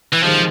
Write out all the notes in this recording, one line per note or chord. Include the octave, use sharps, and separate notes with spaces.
E3
C3 D#3 F3 G#3 C4